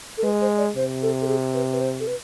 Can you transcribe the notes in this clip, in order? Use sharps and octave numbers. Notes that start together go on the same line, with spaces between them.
A4
G#3 B4
C5
D5
C3 C5
A4
A4
G#4
B4
B4
C5
A4
B4